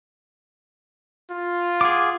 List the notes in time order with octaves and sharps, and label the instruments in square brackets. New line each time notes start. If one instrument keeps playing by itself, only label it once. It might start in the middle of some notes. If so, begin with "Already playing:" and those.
[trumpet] F4
[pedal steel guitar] G#4 F#5 D6